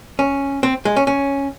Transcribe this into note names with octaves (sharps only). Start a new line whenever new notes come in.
C#4
C4
G#3
C#4
C#4